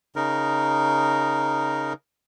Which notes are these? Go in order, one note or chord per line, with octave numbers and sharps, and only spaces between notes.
C#3 D#4 A#4